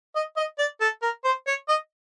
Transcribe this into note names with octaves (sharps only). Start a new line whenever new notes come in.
D#5
D#5
D5
A4
A#4
C5
C#5
D#5